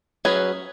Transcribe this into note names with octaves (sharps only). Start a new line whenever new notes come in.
F#3 C#4 G#4 B4